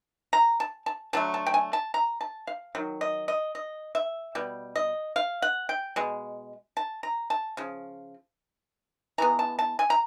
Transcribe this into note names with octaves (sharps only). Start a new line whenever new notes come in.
A#5
A5
A5
D3 F#3 A3 A5
A5
G5
G#5
A5
A#5
A5
F5
D#3 F#3
D#5
D#5
D#5
E5
B2 G3
D#5
F5
F#5
G5
B2 G#3
A5
A#5
A5
C#3 F3
E3 G#3 B3 A#5
A5
A5
G#5
A#5